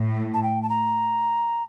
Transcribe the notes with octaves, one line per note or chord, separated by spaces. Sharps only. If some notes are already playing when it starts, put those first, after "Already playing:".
Already playing: A2
A5
G5
A5
A#5